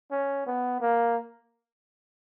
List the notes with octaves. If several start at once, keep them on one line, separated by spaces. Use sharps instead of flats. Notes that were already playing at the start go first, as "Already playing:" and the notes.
C#4
B3
A#3